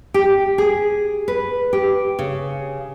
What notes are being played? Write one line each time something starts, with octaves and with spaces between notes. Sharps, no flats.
G4
G#4
B4
G4
C#3